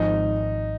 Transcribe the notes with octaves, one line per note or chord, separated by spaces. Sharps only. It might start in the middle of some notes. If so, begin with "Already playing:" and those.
Already playing: G#1 G#2 F3 G#3 D#4